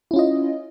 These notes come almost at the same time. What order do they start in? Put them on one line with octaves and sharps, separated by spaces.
E4 C#4 F4 D#5